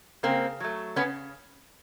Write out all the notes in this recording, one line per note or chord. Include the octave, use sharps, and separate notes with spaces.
C#3 A#3 C4
F#3 A3
C#3 B3 C#4